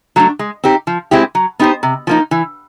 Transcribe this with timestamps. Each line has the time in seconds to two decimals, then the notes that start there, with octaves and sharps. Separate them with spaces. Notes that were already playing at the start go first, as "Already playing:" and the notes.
0.16 F#3 A3 D4
0.39 G#3
0.64 C4 D#4 G4
0.87 F3
1.11 G#3 C4 E4 G4
1.35 F#3
1.60 B3 D#4 G4 C5
1.83 C3
2.07 F3 A#3 D#4
2.31 E3